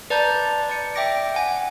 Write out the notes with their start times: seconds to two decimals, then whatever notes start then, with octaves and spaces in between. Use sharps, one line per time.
0.10 B4 D5 A5 A#5 G6
0.69 D5 C#7
0.95 E5 G5 D6 A#6 D7
1.34 F#5 G#5